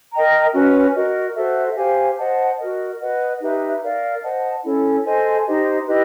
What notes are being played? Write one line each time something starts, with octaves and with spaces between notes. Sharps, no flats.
A#4 D#5 G5 A#5
C#4 F#4 B4
F#4 A#4 D#5
F#4 A4 C5 E5
G4 C5 F5 G#5
C5 D#5 F#5 A5
F#4 A#4 D#5
B4 D#5 F#5
D#4 G4 B4 E5
A#4 D5 F5
C5 D#5 F#5 A5
C#4 E4 A4 C#5
A4 C5 D#5 G#5
D#4 G4 C5 D#5
E4 G4 B4 D#5